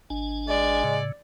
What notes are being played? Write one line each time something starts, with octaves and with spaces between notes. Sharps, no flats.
G#1 D4 G#5
G#3 D5
A2 C#3